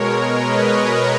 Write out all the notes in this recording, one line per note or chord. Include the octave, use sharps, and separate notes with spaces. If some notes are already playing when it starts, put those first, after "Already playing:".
Already playing: B2 G#3 A#4 C#5
B4 D#5